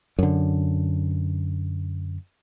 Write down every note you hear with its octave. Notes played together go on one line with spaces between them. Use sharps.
F#2 D3